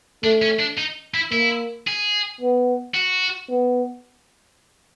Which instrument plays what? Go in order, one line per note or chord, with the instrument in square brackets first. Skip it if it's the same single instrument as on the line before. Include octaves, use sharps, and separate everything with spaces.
[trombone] A3 [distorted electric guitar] D4
[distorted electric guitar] C#4
D4
D#4
E4
[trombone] A#3 [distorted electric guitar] E4
[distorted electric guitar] G#4
[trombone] B3
[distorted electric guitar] F#4
[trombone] B3